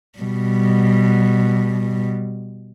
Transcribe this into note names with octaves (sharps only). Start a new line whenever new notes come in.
B2 G3